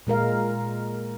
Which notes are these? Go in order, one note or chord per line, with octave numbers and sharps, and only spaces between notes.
A#2 G#3 A#4 F5